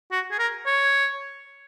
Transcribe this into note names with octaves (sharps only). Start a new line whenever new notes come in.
F#4
G#4
A#4
C#5